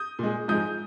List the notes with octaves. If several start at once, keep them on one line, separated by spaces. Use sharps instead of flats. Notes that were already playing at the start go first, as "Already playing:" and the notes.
Already playing: D#6 G6
A#2 G#3
G#2 F3 G#3 D#6 G6